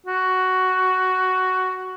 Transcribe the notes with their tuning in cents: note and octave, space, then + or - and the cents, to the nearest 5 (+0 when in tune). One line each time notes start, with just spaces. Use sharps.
F#4 +10